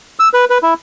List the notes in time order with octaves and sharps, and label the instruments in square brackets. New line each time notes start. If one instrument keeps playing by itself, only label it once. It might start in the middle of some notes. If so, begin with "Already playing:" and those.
[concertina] E6
B4
B4
E4